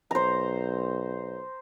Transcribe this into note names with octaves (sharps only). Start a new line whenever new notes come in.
B1 C5 A#5